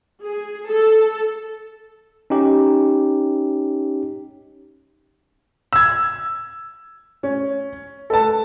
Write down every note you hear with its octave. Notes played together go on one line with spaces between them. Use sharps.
G#4
A4
C#4 D#4 G4
E6 G#6
C#4
A4 B4 A5